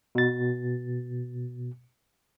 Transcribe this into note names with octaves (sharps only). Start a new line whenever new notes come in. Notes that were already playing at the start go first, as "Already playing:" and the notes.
B2 A6